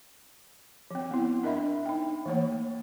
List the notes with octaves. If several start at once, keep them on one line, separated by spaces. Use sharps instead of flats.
F3 C4
B3 C4 E4
D4 A#4 D#5 E5 B5
D#4 G5
E3 A3 A#3 C#5